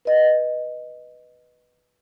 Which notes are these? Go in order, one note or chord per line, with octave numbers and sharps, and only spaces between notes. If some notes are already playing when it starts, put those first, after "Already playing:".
B4 D#5